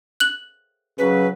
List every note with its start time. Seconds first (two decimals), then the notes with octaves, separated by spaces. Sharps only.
0.20 F#6 F#7
0.98 C#3 F#3 B4